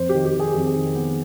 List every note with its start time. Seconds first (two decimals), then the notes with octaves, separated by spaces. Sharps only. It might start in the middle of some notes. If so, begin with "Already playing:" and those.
Already playing: F2 C5
0.09 D#3 G4
0.25 G4
0.35 D#3 G#4
0.53 F2 G4
0.67 G#4
0.75 D#3
0.95 B3